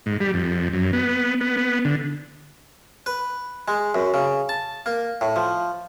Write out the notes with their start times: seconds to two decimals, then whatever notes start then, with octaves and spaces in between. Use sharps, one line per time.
0.06 G#2
0.20 G3
0.34 F2
0.73 F#2
0.93 B3
1.41 B3
1.57 B3
1.85 D3
3.06 B4
3.68 G#3
3.95 F#2
4.14 C#3
4.49 A5
4.86 A#3
5.21 A2
5.36 F3